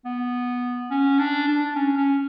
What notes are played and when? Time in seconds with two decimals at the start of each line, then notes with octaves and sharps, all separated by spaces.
0.05 B3
0.91 C#4
1.19 D4
1.48 D4
1.76 C#4
1.97 C#4